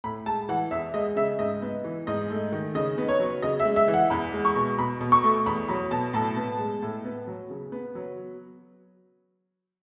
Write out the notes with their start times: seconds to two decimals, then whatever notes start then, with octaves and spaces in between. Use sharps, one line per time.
0.04 A2 B5
0.26 G#3 A5
0.49 E3 F#5
0.71 E2 E5
0.94 G#3 D#5
1.16 C#3 E5
1.39 G#2 D#5
1.62 B3
1.84 E3
2.07 G#2 D#5
2.30 A3
2.52 D#3
2.75 C#3 D#5
2.98 B3
3.09 C#5
3.20 F#3
3.42 C#3 D#5
3.60 E5
3.65 G#3
3.76 E5
3.88 E3
3.94 F#5
4.10 E2 B5
4.33 G#3
4.45 C#6
4.55 B2
4.78 B2 B5
5.01 B2
5.12 C#6
5.23 A3
5.46 E2 B5
5.69 F#3 B5
5.91 B2 A5
6.13 A2 A5
6.37 B3
6.59 G#3
6.82 A2
7.05 B3
7.27 F#3
7.50 C#3
7.72 B3
7.95 F#3